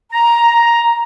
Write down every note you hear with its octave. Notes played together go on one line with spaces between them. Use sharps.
A#5